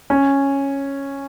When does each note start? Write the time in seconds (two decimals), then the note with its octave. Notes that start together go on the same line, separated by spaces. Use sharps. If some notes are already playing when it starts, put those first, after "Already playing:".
0.10 C#4